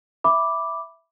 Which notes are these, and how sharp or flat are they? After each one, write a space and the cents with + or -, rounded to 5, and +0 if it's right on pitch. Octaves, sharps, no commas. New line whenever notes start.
E5 +0 B5 +0 D6 +0